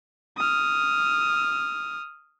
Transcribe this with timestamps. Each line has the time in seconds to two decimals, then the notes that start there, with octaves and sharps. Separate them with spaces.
0.37 D#6 F6